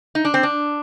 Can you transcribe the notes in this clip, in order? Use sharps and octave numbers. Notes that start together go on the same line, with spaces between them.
D#4
D4
C4
D4